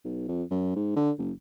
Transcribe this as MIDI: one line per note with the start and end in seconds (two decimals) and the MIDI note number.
0.05 0.27 35
0.28 0.43 41
0.51 0.72 42
0.76 0.93 44
0.96 1.11 50
1.18 1.32 30